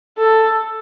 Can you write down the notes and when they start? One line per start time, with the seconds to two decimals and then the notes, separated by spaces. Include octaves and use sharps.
0.18 A4